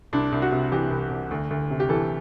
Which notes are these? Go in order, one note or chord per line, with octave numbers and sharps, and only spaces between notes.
C2 D4
C2
F#4
C3
E3 G4
C2
C2
D2
D2
C3
G4
E3 A4